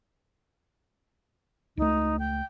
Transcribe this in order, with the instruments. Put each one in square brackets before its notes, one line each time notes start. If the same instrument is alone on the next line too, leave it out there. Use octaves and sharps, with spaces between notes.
[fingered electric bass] C#2 A3 [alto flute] D#4
[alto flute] G5